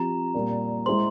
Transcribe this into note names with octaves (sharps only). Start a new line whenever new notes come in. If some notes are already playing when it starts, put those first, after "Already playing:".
Already playing: F3 C4 G4 A#5
A#2 G3 A#3
G#3 E4 G#4 C5 C6